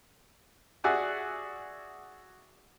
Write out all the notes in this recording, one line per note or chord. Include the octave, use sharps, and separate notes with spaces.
F#4 G#4 D5 E5 F#5 G#5